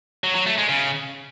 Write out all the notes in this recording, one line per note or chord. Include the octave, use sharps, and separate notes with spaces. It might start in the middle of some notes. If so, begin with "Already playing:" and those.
F#3
F#3
A3
G#3
C#3